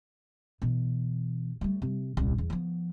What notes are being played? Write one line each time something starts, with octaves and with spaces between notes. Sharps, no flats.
B2 E3
G3 A3
C3
D#1 C2
E2
F3 B3